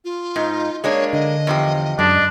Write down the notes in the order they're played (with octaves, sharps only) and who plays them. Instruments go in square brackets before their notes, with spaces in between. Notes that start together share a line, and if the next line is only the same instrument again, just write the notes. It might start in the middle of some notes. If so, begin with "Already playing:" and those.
[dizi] F4
[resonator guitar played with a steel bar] G#2 D#4
[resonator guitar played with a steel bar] G#3 A#3 D4 [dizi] C#5
[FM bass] D3 [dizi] D#5
[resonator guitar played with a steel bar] E2 F3 G4
[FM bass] F#2 [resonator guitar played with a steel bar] G#3 [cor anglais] D4